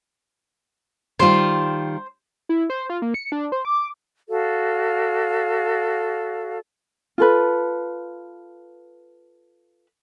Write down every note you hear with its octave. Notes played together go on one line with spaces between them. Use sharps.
D#3 G3 F4 C5
E4
C5
F4
A#3
C#7
D4
C5
D6
F#4 A4 D5 F5
F4 A4 B4